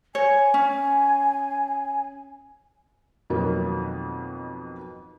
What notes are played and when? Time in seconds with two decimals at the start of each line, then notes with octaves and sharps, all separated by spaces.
0.15 C#5 G#5
0.54 C#4
3.30 F2 B2 D#3 F#3 A#3 B3